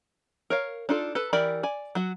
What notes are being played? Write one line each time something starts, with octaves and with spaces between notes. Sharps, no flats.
A#4 C#5 F5
D4 D#4 F4 A4
A4 B4
E3 G4 A#4 D5 B5
D5 G#5
F#3 F#4